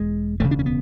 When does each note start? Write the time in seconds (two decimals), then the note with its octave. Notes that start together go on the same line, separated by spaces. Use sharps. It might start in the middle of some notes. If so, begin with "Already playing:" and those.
Already playing: E1 E2 G#3
0.40 E1 D2 C#3 A3
0.51 D4
0.59 C#4
0.66 B3